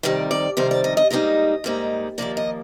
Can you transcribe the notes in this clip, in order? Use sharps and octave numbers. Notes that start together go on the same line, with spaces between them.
F2 C3 D#3 G3 D5
D5
F2 C3 D#3 G3 C5
D5
D#5
D#5
G#2 G3 A#3 D#4 D#5
G#2 G3 A#3 D#4
D#2 D3 F3 A#3 D5
D#5